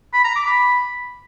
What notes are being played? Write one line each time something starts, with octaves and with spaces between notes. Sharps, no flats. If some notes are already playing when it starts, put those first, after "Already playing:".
B5
A#5
D6
B5